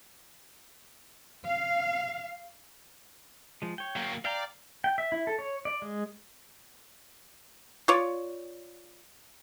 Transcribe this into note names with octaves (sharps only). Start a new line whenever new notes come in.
F5
F3 G#3
C#5 G5
F#3 A#3
D5 F5 G5 A#5
G5
E5
E4
A4
C#5
D5
G#3
F4 C#5 D5